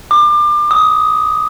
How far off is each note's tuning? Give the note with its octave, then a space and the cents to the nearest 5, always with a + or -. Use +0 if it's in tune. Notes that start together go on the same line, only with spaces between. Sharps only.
D6 +30
D#6 +15